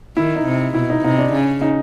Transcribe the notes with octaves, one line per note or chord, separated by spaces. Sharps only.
D#3 E4
D#4
C3
B2 E4
D#4
C3 D#4
D4
C#3
D#4